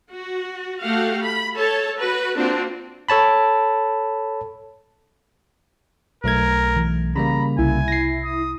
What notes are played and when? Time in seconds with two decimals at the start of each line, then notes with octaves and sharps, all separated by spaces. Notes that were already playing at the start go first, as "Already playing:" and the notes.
0.13 F#4
0.81 A3 F#4 G4 F5 F#5
1.21 B5
1.56 A4 C#5 A5
1.98 F#4 B4
2.37 A#3 C4 D4 F4 F#4
3.08 A4 C#5 A5 B5
6.24 B1 A3 A#4 G#6
6.76 E3
7.16 C#3 G3 A#3 A#5 B5
7.58 C2 E4 G#5
7.88 A#6 C7
8.24 D#6